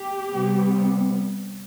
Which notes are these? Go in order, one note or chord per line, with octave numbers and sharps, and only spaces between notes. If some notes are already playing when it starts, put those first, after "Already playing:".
Already playing: G4
C3 G3 B3